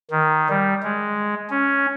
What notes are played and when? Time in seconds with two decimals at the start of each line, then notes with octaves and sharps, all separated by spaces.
0.11 D#3
0.49 G3
0.83 G#3
1.50 C#4